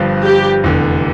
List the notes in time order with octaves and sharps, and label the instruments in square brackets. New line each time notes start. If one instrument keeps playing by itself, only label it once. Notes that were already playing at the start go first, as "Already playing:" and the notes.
Already playing: [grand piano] G1 G2 F3
[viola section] G4
[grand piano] F1 E2 D3